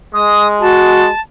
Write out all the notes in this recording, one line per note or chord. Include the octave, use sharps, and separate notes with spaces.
G#3 D#6
F#4 A5